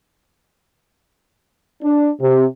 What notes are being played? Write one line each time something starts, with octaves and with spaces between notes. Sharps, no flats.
D4
C3